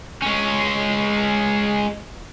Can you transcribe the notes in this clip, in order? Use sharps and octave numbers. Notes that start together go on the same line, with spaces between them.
G#3 C#4